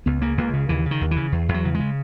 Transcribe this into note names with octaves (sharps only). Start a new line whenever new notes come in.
C#2 B3
C#3 A#3
C#2 A#3
C#3
D#2 E3
C#3
D#3
D#2
E3
C#3
E2
E2
F#3
C#3
G#3
C#3